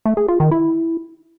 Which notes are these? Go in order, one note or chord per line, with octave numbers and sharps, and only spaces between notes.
A3
G#4
F4
D#3
E4